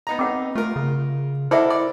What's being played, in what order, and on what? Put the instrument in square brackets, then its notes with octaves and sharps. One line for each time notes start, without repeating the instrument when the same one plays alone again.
[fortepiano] B3 D#4 A#5
[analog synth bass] C4 [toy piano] C#5 F#5 D6
[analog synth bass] A3 [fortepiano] F4 A#4
[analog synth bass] C#3
[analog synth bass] E4 [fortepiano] A4 A#4 D5 [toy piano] C5 E5 F#5
[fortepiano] D5